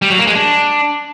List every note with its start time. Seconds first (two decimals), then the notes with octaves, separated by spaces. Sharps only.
0.02 G3
0.10 F#3
0.19 A#3
0.27 G#3
0.36 D4